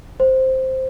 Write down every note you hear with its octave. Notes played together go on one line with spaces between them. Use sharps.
C5